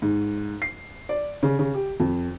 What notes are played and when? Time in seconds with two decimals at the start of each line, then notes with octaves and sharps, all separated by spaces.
0.02 G#2
0.62 C7
1.09 D5
1.43 C#3
1.59 C#3
1.74 G4
2.00 F2